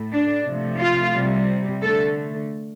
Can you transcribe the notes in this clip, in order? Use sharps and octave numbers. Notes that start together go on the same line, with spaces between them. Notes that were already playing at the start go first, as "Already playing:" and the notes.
Already playing: A2 A3
D4
C3 F3 A3
F4
C3 G3
D3 A3 A4